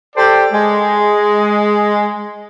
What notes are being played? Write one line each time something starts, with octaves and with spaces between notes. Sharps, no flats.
G4 A4 C5 D5
G#3